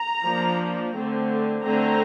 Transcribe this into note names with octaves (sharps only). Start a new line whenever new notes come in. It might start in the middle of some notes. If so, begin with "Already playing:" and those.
Already playing: A#5
F3 A#3 D4
D3 A3 C4
D3 A3 C4 A#5